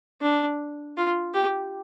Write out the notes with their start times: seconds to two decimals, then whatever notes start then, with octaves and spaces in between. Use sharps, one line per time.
0.21 D4
0.97 F4
1.34 G4